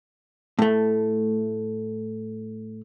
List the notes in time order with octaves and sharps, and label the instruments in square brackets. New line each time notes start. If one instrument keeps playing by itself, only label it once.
[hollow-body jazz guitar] A2 A3